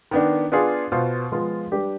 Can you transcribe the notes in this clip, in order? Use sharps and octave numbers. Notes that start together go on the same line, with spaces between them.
D#3 B3 D4
B3 D4 F4 G#4
B2 B3 F4 C5
F3 G#3 B3 F4
G3 D4 G4 B4